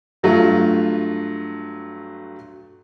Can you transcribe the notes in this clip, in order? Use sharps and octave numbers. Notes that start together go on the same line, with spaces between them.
G2 F#3 A3 F4